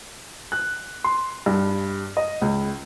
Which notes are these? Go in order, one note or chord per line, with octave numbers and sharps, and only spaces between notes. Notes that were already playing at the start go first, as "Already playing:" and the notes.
F#6
C6
G2
D#5
C#2